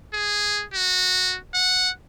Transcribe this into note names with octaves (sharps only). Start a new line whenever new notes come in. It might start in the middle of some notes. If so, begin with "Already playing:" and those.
G#4
F#4
F#5